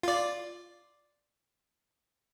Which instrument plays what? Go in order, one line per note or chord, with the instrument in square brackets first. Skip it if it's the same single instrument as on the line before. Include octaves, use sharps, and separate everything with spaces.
[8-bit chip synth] F4 D5